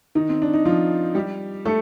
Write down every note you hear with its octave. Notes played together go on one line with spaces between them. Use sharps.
D#3 D#4
C4
D4
D#4
F3 F4
G3 G4
A3 A4